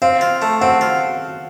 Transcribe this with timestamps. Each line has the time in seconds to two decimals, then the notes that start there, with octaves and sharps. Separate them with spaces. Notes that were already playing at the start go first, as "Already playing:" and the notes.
0.02 C4 F5
0.21 F4
0.42 A3
0.61 C4 F#5
0.81 F4